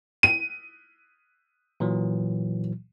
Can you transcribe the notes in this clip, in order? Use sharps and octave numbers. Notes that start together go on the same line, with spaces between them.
D#7
A#2 E3 F#3